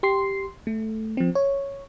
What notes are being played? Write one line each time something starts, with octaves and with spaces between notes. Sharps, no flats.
G4 C6 C7
A3
F3 C4
C#5